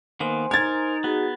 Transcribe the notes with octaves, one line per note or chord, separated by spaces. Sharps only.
D#3 A#3 B3 C5 G#5 C6
D#4 A#4 G#6 A6
B3 F#4 G#4